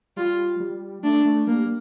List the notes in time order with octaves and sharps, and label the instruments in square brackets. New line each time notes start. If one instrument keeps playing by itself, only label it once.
[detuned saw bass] G3 [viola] F4
[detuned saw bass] G3
[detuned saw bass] A3 [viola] D4
[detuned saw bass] A3
[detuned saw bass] G3 [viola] A#3